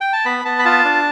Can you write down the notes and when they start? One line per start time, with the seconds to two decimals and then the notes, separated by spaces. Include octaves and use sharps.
0.01 G5
0.13 A5
0.25 B3 B5
0.45 B3 A5
0.59 B5
0.65 F4 A5
0.85 D4